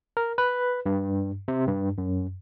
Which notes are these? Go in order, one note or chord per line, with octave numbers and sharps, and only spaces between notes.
A#4
B4
G2
C3
G2
F#2